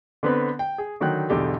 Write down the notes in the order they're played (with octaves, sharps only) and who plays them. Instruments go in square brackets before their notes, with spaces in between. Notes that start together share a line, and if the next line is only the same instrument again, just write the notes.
[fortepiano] D3 B3 C4 B4
G5
G#4
D3 D#3 F#3 G5 F#6
B1 E2 D3 G4